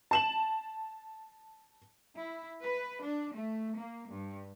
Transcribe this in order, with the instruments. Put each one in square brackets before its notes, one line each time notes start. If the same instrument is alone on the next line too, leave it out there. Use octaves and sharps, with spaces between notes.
[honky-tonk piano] A5 E7 F#7
[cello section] E4
B4
D4
A3
A#3
G2